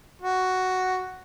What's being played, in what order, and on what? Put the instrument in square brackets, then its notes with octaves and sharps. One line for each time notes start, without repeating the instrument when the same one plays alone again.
[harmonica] F#4